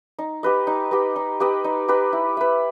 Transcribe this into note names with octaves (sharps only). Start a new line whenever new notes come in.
D#4
G4 B4 D#5
D#4
G4 B4 D#5
D#4
G4 B4 D#5
D#4
G4 B4 D#5
E4
B4 E5